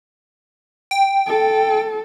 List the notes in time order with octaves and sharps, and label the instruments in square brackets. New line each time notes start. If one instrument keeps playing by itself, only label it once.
[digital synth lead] G5
[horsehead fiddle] A4